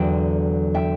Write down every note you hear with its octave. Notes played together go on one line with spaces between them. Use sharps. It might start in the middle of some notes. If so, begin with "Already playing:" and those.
Already playing: E2 D3 F#3 E5 G5
E5 G5